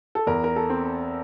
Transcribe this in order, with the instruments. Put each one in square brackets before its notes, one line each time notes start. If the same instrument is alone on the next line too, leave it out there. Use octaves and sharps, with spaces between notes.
[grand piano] A4
E2 A#4
A#4
A4
C4